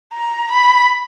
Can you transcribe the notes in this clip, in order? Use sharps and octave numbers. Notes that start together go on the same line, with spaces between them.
A#5
B5